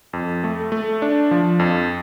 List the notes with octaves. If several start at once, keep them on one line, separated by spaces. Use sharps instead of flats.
F2
A3
A3
D4
F3
F2